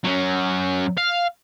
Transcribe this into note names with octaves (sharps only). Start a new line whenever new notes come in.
F#3 C#4
F5